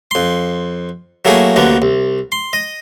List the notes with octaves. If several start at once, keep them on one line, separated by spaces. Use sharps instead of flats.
F2 C6
F#3 A3 A#3 E4 G#4
A1 D2 D3 A#3 B3
C2
C6
D#5